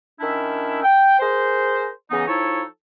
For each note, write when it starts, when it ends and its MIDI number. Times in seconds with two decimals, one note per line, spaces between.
0.20 0.79 51
0.20 0.79 61
0.20 0.79 62
0.20 0.79 64
0.82 1.18 79
1.19 1.88 68
1.19 1.88 70
1.19 1.88 72
2.10 2.24 49
2.10 2.24 52
2.10 2.24 59
2.10 2.24 63
2.27 2.62 53
2.27 2.62 63
2.27 2.62 64
2.27 2.62 69
2.27 2.62 73